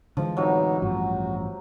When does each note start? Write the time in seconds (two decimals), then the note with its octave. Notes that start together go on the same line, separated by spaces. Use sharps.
0.17 D3 E3 F3 G#3
0.37 A2 C3 F#3 B3 D#4
0.82 A1 G2 F3 F#4